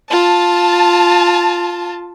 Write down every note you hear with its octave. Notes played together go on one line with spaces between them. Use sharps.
F4 A5